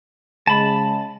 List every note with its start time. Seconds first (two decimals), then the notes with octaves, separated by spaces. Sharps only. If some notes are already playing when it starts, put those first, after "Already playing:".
0.47 C#3 G#3 A5 B5